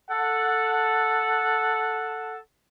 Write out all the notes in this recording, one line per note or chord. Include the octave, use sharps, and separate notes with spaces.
A4 F#5